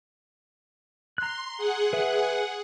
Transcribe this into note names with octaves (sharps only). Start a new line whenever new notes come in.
A#5 C6 F#6
G#4 F#5
B4 E5